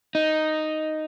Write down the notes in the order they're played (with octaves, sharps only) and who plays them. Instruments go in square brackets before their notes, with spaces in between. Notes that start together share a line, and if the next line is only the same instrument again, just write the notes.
[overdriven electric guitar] D#4